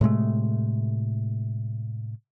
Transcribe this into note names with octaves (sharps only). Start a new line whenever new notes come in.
A2 C3 G#3 A3